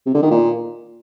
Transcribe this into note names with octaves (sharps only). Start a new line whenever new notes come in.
C3
D3
D#3
A#2